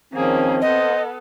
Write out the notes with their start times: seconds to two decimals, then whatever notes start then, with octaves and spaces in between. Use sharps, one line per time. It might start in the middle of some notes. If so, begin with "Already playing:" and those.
0.13 D#3 F3 A#3 C4 C#4 G#4
0.62 B3 A4 C5 D#5